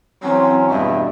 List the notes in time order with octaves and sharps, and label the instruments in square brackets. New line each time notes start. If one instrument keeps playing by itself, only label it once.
[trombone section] E3 F#3 C#4 [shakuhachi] C4
[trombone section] E2 G2 B2 [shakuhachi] E5